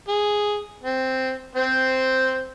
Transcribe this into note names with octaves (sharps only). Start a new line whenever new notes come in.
G#4
C4
C4 C5